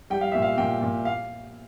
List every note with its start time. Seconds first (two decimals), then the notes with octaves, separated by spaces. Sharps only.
0.10 G3 G5
0.21 F5
0.32 A#2 E5
0.42 F5
0.57 A#2 G5
0.81 A#2
1.05 F5